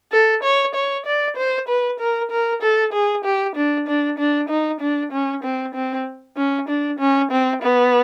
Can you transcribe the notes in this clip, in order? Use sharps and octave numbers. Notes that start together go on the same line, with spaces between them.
A4
C#5
C#5
D5
C5
B4
A#4
A#4
A4
G#4
G4
D4
D4
D4
D#4
D4
C#4
C4
C4
C#4
D4
C#4
C4
B3